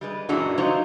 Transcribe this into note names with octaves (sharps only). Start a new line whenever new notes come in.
G3 G#3 B4
F#2 A#2 E3 G#3 D4 F#4
F#3 D#4 F4 C5